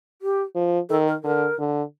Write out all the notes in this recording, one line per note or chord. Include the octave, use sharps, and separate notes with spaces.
G4
F3
D#3 A4
A#4
D3 A#4
D3